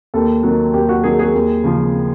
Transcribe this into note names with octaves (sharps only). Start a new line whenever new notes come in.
D#2 A4
D#3 F#3
D#2 G4
F#4
D#3 F#3 G#4
G#4
D#2
C#3 F3